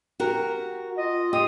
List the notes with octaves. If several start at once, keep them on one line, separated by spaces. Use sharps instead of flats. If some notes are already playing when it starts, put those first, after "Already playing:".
F#4 G4 A#4
F4 D#5
G4 D#5 C6 D#6